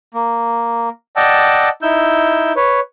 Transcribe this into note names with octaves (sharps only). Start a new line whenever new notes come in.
A#3
D5 D#5 F#5 G5 A5 E6
D#4 E4 E6 G6
B4 C#5